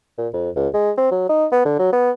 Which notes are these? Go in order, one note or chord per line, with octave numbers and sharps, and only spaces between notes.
A#2
F2
C#2
G#3
C4
F#3
D#4
B3
D3
F#3
B3